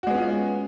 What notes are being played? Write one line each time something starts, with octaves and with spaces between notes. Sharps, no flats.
G#3 B3 C#4 F4 F#4